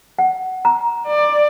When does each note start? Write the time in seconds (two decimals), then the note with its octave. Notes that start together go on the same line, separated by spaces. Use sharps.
0.19 F#5
0.65 A#5
1.07 D5